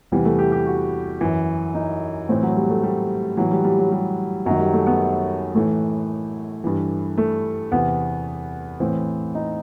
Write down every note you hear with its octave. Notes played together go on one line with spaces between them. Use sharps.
E2 C3 E3 G3
A3
G4
G4
F#4
F#2 E3
D#4
A2 E3 C4
F#3
G3
A3
G3
A2 E3 F#3
G3
G3
F#3
G3
F#2 D#3 F#3
G3
A3
B3
A2 E3 A3
G2 E3
A3
E2 C3 E3 B3
A2 E3 C4
D#4